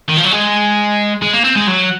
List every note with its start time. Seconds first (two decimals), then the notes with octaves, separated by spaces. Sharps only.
0.09 D#3
0.18 F3
0.25 F#3
0.32 G#3
1.22 G#3
1.33 A#3
1.44 C4
1.56 G#3
1.68 F#3